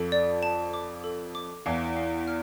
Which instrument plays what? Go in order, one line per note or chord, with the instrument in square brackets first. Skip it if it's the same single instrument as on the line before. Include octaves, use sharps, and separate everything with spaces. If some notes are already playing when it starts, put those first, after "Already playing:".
Already playing: [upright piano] F2 F3 [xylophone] A4
[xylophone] D5
A5
D6
A4
D6
[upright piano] E2 E3 [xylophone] F5
[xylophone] F5
F6